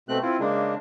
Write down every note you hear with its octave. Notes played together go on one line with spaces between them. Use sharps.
B2 A3 C4 F#6
C4 E4 F4
C#3 G#3 A#3 D4